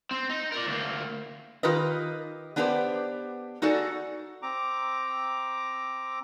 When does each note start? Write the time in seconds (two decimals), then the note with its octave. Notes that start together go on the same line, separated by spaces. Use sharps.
0.11 C4
0.29 D#4
0.52 A#4 D5
0.67 D2 A#3
1.63 D#3 F4 G4 A#4 B4 D#5
2.56 B3 D4 G4 G#4 B4 C5
3.62 D#4 F#4 G#4 A4 D5
4.42 C4 A#5 D6